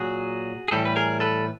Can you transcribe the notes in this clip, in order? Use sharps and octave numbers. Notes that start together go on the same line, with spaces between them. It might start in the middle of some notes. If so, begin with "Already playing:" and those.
Already playing: A#2 F#3 F#4 G#4
G#4
A2 E3 G3 G4 A4
B4
G#4 A#4
A4 B4